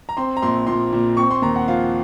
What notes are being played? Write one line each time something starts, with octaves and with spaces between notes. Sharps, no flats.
A#5
C4 C6
A#5
A#1 C6
A#2 C6
A#2
C4 C#6
C6
D#2 A#5
F#5
F3 F5